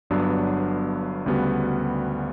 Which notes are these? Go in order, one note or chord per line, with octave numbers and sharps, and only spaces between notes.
G1 G2 F#3 B3 D4
D2 C#3 G3 B3 F#4